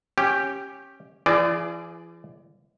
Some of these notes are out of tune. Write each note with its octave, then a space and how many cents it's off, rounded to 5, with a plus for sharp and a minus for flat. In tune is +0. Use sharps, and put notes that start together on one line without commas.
C#4 -15 G4 +0
E3 +40 G#4 +0 D5 +0